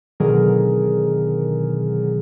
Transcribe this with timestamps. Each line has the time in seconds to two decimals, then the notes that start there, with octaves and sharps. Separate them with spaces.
0.20 B2 D3 D#3 F#3 G#4 A#4